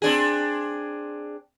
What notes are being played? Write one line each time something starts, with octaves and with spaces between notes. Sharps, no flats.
C4 D4 G#4